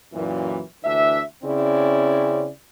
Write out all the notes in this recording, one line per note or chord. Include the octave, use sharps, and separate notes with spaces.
F#2 A#2 E3
D2 E3 D4 E5
C#3 C4 C#4 E4 D5